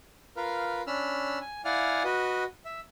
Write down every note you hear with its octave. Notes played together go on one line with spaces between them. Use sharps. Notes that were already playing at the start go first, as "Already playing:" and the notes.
F4 A#4 B4 F5
C#4 D4 B5 E6 F6
G#5
E4 D5 F5 F#5 G#5 F6
F#4 B4 D#5
E5